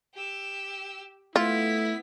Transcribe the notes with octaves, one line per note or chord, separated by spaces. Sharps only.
G4 E6
A3 B3 E4 F4 B6